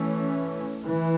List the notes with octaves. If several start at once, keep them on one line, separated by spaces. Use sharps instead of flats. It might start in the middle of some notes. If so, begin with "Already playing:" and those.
Already playing: E3 A3 C#4
E3